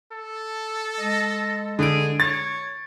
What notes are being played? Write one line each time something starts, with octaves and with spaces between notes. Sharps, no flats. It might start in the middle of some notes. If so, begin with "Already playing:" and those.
A4
G#3 D#5
D3 G#4 D7
C#5 A6